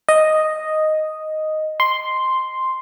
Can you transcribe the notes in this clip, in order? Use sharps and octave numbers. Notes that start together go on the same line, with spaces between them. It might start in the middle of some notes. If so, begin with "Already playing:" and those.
D#5
C6